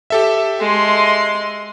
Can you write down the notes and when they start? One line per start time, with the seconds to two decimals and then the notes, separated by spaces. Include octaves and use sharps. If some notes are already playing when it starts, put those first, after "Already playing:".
0.10 G4 A4 E5
0.60 G#3 C6